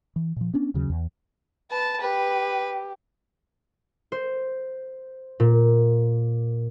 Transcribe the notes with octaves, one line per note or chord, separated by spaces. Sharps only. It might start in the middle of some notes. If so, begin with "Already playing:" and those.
E3
A#2 F3
B3 C#4 D4
D#2 C#3 F#3
E2
B4 A5
G4 B4
C5
A#2